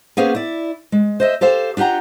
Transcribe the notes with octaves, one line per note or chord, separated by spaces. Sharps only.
A#3 B3 C#4 G#4 C5 F5
E4 D5
G#3
C5 D#5 E5
G4 A4 C5 F5
D4 F4 G4 F#5 A#5